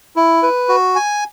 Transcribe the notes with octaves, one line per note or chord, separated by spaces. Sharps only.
E4
B4
F#4
G#5